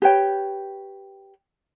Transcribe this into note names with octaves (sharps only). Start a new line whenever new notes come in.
G4 B4 C#5 G5